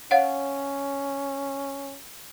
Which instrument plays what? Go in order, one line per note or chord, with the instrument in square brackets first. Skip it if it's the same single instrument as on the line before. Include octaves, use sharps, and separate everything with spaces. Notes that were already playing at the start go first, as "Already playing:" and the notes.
[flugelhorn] C#4 [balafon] C#5 F5 F#5